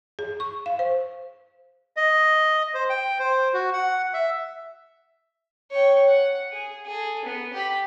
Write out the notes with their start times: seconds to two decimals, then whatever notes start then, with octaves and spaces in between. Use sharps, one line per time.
0.19 G#4
0.40 C#6
0.66 F5
0.79 C5
1.97 D#5
2.74 C5
2.90 G5
3.19 C5
3.54 F#4
3.73 F#5
4.14 E5
5.71 C#5 G5
6.07 F#5
6.52 G#4
6.86 G#4 A4
7.25 B3
7.53 G4 B5